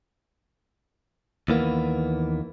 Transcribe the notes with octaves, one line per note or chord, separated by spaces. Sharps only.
D#2 E3 A#3 B3